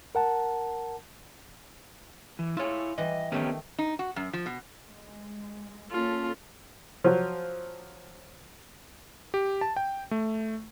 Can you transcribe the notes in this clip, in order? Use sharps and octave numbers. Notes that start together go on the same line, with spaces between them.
A#4 F#5 A5
E3
E4 F4 G#4 C#5
E3 G3 D#5
D#3 A3 B3 C#4 D#4 G4
D#4
F#4
F#2
F3
B2
G#3
A#3 C#4 F4 A4
F3 F#3
G4
A5
G5
A3